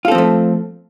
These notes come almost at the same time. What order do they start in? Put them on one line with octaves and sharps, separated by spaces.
F4 A4 C4 F3 A3